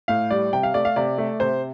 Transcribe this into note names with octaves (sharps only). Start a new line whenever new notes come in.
A2 F5
G3 D5
C3 G5
F5
A3 D5
F5
C3 D5
A3
C3 C5